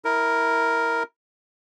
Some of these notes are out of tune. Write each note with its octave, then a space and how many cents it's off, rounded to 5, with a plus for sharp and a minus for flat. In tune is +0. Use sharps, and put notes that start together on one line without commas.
E4 -20 A#4 +0